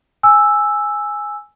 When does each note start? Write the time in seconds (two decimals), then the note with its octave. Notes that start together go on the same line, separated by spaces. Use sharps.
0.23 G#5 E6